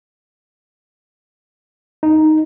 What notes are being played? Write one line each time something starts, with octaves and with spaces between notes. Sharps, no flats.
D#4